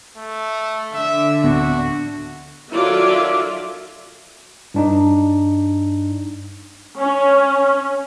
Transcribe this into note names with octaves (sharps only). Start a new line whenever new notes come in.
A3
D3 D4 E5
D1 B3 C4 F#4
D#3 F#3 F4 A4 D5 E5
G2 D4 D#4
C#4